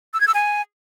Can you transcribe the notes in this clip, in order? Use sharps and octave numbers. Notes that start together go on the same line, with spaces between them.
E6
G#6
E6
G#5